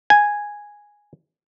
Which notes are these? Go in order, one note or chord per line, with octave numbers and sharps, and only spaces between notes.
G#5